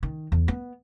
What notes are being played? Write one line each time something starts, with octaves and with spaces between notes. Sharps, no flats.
D#3
E2
B3